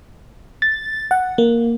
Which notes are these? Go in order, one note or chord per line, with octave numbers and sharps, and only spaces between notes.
A6
F#5
A#3